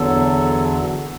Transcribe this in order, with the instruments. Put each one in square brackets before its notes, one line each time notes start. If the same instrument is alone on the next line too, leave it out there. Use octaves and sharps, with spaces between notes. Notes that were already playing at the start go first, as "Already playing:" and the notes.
Already playing: [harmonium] E2 D3 F#3 A4